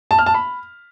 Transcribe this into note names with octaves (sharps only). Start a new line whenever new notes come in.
A5
F6
A5
B5